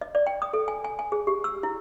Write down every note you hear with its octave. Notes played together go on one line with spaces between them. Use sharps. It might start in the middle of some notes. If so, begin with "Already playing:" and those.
D#5
D5
G5
D#6
A4
G#5
G#5
G#5
G#4
G4
E6
E4